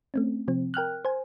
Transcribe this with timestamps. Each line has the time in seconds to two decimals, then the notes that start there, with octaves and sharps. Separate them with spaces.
0.14 A3 C4 C#4
0.48 C3 F3 C4
0.74 A#4 G5 F6 F#6
1.05 C5 G#5